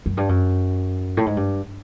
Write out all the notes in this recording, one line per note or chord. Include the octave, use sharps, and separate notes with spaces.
F#2
G2
F#2
A2
G#2
G2